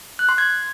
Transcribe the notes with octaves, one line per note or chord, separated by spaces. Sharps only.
F#6
C6
G#6